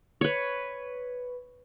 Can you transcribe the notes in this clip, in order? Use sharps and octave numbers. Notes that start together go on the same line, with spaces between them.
B4 C#5